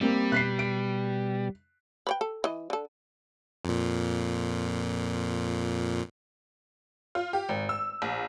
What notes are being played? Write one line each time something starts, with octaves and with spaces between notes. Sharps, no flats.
G3 A#3 C4
B2 F#6 B6 C7
D7
B4 C#5 G5
A4
E3 D#5
D3 A4
F2 A#2
F4
G4
G#1
E6
A#1